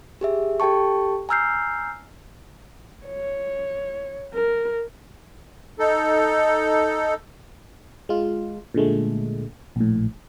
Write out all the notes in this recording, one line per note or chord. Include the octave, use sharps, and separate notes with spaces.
G4 G#4 E5
G4 A4 G5 A5 C#6
G#5 A#5 E6 F6 G6 C7
C#5
A#4
D#4 A4
G#3 F4
A#2 D3 G#3 A3
A#1 A2